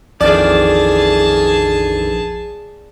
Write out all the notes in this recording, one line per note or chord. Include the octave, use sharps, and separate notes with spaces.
A#1 F2 D#3 E3 G#4 D5 A5